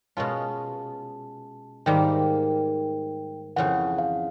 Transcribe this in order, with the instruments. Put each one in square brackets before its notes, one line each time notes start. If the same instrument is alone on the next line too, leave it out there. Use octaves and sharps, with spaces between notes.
[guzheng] B2 G#3 C#4 F4 [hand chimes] A5
[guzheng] G#2 D#3 G3 A#3 [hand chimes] G5
[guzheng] F2 C#3 E3 [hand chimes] F#5
[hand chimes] F5